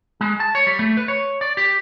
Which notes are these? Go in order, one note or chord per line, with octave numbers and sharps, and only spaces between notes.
G#3
A5
C#5
G3
A3
B4
C#5
D5
G4